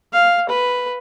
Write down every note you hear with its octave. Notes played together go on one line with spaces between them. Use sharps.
F5
B4